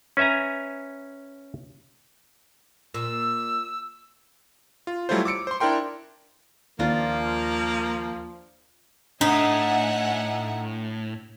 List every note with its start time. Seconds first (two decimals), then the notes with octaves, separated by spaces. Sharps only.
0.17 C#4 B4 E5 G#5 A#5
2.94 A#2 E6
4.87 F4
5.09 F#3 G3 A3 E4 F4 C5
5.25 D6 E6 C#7 D7
5.47 C5 C6
5.60 D4 E4 A#4 G5 C6
6.79 D#2 F3 A#3 D4 F4 A#5
9.21 A2 D4 D#4 E5 F#5 G#5 B6